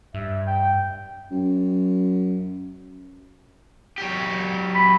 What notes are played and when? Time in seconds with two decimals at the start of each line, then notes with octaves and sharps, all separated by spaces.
0.14 G2 E5
0.47 G5
1.31 F#2
3.98 F#3 G4
4.75 B5